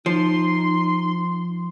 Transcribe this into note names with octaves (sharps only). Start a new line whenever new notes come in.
F3 D#4 C6